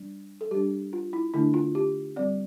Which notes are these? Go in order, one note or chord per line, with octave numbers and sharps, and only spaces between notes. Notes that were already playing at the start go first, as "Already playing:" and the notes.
Already playing: G3 D4
A4
G3 D4 G4
F4
E4
D3 A3 D4 E4
F4
G4
G3 C4 D5